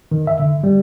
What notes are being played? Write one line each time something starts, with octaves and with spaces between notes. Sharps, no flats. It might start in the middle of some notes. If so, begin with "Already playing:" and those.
D#3
E5
D3
G3